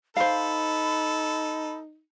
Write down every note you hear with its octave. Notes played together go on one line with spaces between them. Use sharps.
D#4 A4 C5 F5 B5